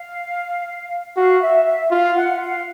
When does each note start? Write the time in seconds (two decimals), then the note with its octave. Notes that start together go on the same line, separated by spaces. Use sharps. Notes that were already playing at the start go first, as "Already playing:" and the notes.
Already playing: F5
1.17 F#4 F5
1.41 E5
1.66 E5
1.91 F4 F5
2.16 F#5
2.40 F5